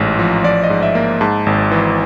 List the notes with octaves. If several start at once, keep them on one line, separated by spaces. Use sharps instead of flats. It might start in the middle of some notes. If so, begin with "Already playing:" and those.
Already playing: A1 G#2
F3
F3 D5
D#5
G#2
E5
A#3
G#2 A5
G#1
E3